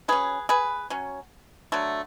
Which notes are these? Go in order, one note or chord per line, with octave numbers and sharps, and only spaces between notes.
F#3 C#4 G#4 B4
G#4 B4
F#3 C#4
D3 F#3 A3